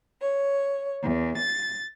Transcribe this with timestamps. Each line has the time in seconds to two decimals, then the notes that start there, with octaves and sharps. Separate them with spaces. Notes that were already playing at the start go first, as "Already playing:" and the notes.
0.21 C#5
1.03 E2
1.39 A6